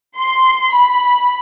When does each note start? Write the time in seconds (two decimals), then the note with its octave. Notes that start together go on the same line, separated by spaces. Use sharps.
0.18 C6
0.73 B5